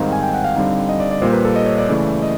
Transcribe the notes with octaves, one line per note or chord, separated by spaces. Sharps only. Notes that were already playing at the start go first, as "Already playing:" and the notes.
Already playing: G#2 D#3 G3 C4 D#4 F5
G#5
G5
F#5
F5
D3 G3 C4 D#4 F5
D#5
D5
D5
A#2 G3 A#3 C5
B4
A4
D#5
C#5
D5
C#3 E3 A3
D#5